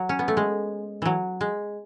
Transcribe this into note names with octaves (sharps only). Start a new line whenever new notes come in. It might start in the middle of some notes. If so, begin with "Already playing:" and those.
Already playing: F#3
C#4
B3
A3
G#3
E3 F#3
G#3